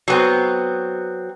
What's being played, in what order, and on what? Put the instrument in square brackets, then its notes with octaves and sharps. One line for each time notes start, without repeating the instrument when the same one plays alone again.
[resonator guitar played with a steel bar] F#3 B3 C4